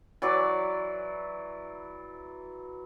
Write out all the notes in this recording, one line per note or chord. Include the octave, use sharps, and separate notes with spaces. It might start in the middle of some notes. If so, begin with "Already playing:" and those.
E3 F#3 D5